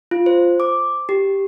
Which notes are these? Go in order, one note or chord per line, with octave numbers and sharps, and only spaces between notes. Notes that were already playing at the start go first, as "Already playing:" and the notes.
F4
C5
D6
G4